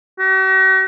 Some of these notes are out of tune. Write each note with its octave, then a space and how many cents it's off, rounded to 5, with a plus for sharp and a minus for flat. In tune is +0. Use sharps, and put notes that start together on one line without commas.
F#4 +45